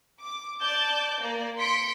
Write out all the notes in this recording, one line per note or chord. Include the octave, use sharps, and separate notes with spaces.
D6
D5 A5 D6 G6
A#3 D5
C6 B6 C#7 D7